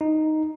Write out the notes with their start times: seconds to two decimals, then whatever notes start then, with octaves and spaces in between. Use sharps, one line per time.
0.01 D#4